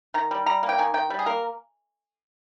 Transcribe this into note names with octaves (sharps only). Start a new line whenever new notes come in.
D#3 A#5
G3
G3 A#5
A#3
G5
D#3 G#5
D#3 G5
G3
G#4
A#3 A#4